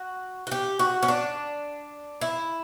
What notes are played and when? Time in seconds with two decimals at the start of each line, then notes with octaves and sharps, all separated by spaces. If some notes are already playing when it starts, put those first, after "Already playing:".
Already playing: F#4
0.47 F#4
0.51 G4
0.79 F#4
1.03 C#4
1.08 D4
2.21 E4